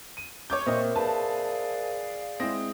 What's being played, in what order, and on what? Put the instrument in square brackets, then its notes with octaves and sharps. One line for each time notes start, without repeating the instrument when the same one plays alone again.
[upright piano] D#7
[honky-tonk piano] C#5 D6 G6 [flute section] C#6
[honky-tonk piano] A#2 D#5 [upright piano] C4 [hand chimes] A#4 C5 E5
[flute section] G#4 D5 F5 [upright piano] B4 [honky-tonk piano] A5
[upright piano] G#3 E4 A#6 [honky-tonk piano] C4 [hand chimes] D#6